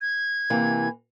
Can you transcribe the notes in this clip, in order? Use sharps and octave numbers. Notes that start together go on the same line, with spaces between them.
G#6
C3 E3 A#3